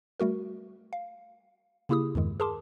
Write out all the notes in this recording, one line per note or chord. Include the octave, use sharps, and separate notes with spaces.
G3 A3 F#4 A#4
F5
C#3 A#3 E4 G4 G#4 D#6
E2 G2 D#3 G#3
G#4 A#4 A5 C6 D6